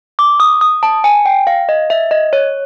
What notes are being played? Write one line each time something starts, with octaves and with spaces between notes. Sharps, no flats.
D6
D#6
D#6
A5
G#5
G5
F5
D#5
E5
D#5
C#5